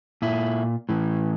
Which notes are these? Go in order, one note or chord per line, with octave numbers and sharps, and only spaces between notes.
A#2 E4
A2 E3